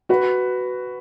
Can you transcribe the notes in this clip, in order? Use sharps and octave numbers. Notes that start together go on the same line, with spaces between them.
F#4 B4